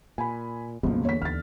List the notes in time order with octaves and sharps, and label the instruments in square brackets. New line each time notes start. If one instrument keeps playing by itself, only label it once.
[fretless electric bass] A#2 [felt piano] G#5 B5
[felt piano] G1 C#2 [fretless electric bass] B2 F3 [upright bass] A#3 B3
[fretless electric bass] E2 D3 [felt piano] C#5 B6
[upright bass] D#2 [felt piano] F6 A6